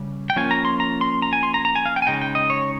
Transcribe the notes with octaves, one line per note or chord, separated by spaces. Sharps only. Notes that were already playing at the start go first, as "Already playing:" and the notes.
Already playing: C#3 G3 C#4
G5
F3 A#3 C#4 F4 G#5
A#5
C6
A#5
C6
A#5
G#5
C6
A#5
A#5
G#5
F5
G5
G#5
C#3 G#3 D#4 G5
G5
D#5
C#5